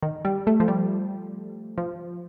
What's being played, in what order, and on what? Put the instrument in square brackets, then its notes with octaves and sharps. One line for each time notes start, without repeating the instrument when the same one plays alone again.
[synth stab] D#3
G3
A3
F3
G3
F3